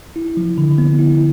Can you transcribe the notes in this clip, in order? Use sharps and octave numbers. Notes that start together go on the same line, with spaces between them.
E4
F3
D3
B3
E4